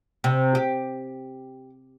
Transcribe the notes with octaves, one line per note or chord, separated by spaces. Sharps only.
C3
G4